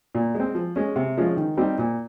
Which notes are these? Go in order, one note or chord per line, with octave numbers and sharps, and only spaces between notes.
A#2
G#3
C4
F3
G#3 C#4
C3
F3 G#3 C#4 F4
D#3
G3 C4 D#4 G4
A#2